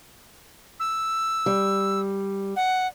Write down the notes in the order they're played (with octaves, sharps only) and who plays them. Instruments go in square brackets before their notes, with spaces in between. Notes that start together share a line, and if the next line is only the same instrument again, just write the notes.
[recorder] E6
[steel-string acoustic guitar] G3
[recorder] F#5